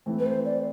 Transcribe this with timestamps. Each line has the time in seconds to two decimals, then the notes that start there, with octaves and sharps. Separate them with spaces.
0.06 E3 A3 C4
0.19 B4
0.26 C5
0.45 D5